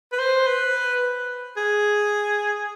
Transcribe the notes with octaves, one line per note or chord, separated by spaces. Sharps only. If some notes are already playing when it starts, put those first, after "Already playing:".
B4
C5
B4
G#4